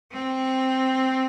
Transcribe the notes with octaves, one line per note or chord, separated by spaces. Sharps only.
C4